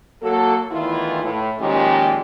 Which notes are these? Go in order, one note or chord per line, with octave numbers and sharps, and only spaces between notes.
F#3 A#3 F#4 A4
E2 D#3 E3 A3 E4 F4
A2
A#2 D#3 F3 G#3 C#4 G4